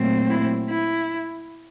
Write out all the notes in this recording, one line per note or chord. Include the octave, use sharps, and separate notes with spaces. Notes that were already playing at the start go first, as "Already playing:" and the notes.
Already playing: A#2 F#3 A3 C4
E4
E4